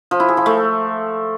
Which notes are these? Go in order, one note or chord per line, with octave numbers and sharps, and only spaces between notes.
F3
E4
G#4
F3
A3